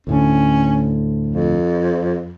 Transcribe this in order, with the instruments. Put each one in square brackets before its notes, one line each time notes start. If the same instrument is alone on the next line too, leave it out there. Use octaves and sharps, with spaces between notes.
[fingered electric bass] D2 A2 D3 [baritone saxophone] C#4
[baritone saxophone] F2